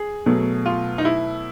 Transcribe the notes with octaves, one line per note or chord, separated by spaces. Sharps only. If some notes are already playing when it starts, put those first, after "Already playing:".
Already playing: G#4
B2 F#3 A3
F4
D#4
E4